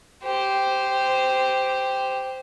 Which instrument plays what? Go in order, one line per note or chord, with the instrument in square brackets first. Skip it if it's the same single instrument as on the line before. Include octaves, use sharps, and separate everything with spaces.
[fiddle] G4 C5